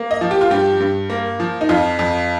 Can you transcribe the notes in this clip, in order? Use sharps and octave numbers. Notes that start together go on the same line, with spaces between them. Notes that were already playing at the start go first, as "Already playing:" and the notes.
Already playing: A#3
D#5
F3
G4
F4
G2 G4
G2
A#3
F3
D#4
F2 F4
F2